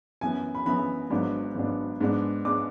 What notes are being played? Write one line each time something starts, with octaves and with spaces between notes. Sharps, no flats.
F#2 E3 B3 G#5
B5
F#2 E3 B3 B5
G#1 G#2 F#3 B3 D4
G#1 G#2 F#3 B3 D4
G#2 G#3 B3 D4
G#3 B3 D4 D6